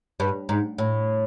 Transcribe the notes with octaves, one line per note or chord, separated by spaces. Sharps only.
G2
G#2
A2